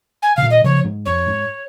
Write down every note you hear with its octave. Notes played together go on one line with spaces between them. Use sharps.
G#5
C#3 F5
A#2 D#3
D#5
C#3 F3 C#5
G#2
F2 C#5
G#2